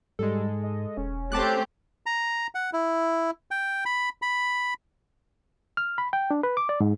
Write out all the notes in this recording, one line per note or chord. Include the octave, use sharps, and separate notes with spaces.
G#2 G3 G#3 A4
D#5
E1 C#4
A3 C4 G4 A5 D6 F#6
A#5
F#5
E4
G5
B5
B5
F6
B5
G5
D4
B4
D6
D5
G#2